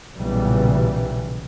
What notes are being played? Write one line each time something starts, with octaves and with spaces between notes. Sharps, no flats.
B1 A#2 C#3 E3 G3